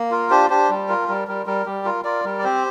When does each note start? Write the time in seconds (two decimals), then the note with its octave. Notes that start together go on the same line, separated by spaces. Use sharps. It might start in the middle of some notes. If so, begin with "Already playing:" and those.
Already playing: A#3
0.11 F4 A#4
0.30 D4 G4 C5
0.50 D4 G4 C5
0.70 G3
0.89 F4 A#4
1.08 G3 A#4
1.28 G3 A#4
1.46 G3 A#4
1.66 G3 G4
1.85 F4 A#4
2.05 F4 A#4 D5
2.25 G3 A#4
2.39 D5
2.44 C4 G4 C5